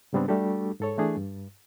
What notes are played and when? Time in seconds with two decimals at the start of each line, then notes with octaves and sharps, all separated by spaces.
0.13 G#2 C#3 G3 B3 C4 D4
0.28 G3 A3 D4 F#4 G4 A4
0.80 G#2 A4 C#5
0.98 E3 A3 D4 G#4
1.17 G2